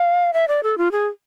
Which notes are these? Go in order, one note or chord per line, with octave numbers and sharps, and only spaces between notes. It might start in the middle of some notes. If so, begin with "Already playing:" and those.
Already playing: F5
E5
D5
A4
F4
G#4